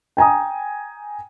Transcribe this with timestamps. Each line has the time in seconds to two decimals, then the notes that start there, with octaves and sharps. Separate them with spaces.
0.17 G5 G#5 A#5 D#6